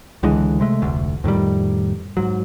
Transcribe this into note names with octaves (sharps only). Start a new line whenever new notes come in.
C#2 D3 E3 G#3
C3 G#3 A3
F1 D2
F2 A2 D#3 G3
G#2 F#3